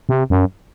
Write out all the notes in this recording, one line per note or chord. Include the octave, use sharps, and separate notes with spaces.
C3
F#2